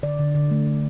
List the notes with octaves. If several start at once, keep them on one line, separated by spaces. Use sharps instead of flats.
D3 D5
D3
D3
A3
A3